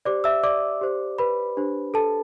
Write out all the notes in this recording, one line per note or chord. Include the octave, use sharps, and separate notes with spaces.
G4 C5 D5 D6
E5 E6
D5 D6
G4 C5
B4 B5
D4 G4 C5
A4 A5